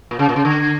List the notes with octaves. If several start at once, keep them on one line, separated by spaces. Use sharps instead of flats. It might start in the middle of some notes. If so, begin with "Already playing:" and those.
A#2
C#3
A#2
C#3
D3